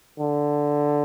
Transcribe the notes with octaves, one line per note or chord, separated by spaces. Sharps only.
D3